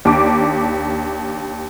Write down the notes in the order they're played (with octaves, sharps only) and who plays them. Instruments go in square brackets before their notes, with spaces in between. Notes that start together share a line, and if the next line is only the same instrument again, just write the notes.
[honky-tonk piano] D#2 D4 A5 D6